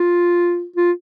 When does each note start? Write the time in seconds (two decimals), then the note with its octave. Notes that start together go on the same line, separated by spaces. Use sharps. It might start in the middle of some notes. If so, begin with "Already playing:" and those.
Already playing: F4
0.76 F4